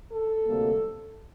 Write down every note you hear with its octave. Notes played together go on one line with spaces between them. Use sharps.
A4
D2 C3 G3 A#3